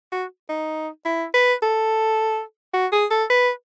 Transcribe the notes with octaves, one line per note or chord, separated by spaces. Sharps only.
F#4
D#4
E4
B4
A4
F#4
G#4
A4
B4